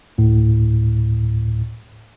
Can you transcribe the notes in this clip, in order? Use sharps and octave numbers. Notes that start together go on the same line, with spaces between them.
D2 A2